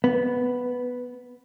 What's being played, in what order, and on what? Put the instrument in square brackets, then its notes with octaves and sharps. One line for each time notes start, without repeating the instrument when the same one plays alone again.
[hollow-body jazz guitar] B3